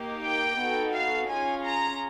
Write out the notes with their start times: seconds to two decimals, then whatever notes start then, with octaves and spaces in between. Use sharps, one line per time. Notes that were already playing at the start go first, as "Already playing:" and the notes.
Already playing: A#3 D#4 G4
0.24 G5
0.59 B3 D#4 F#4 A4
0.94 F5
1.29 C#4 F4 G#4 G#5
1.64 A#5